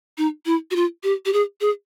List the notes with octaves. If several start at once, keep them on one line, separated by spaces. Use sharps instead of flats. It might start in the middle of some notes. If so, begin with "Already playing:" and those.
D#4
E4
F#4
F4
G4
G4
G#4
G#4